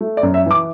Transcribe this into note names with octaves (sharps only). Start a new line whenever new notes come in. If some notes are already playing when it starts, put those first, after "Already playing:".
A3
D5
F#2
E5
E3 D6